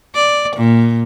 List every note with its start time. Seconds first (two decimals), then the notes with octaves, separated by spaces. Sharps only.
0.15 D5
0.56 A#2